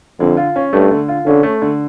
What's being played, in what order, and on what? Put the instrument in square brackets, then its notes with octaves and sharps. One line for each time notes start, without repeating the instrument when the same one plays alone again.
[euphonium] F2 [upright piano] D3
[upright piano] F4
C#4
[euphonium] G2 [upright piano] A3
[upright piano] D3
F4
[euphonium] D3 [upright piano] C#4
[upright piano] A3
D3